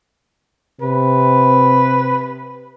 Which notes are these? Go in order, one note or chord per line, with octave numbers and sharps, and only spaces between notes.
C3 B4